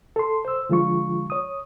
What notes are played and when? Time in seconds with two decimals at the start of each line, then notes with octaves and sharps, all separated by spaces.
0.16 A4 C6
0.45 C5 E6
0.70 D3 F3 G#3 F4 C#6
1.30 C#5 D#6